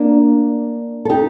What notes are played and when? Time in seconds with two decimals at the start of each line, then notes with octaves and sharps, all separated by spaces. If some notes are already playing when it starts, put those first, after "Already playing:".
Already playing: A#3 D4
1.05 A4
1.09 D#4 G4